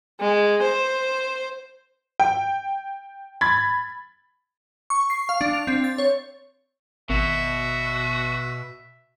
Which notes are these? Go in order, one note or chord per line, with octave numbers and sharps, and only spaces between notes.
G#3
C5
G5
B5 G#6 A6
C#6
C7
F5
D4
F7
C4
A6
C#5
G#1 B2 F#4 E5